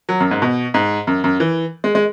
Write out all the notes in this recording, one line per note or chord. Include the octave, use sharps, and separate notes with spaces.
F#3
F#2
G#2
B2
G#2
F#2
F#2
E3
G#3
G#3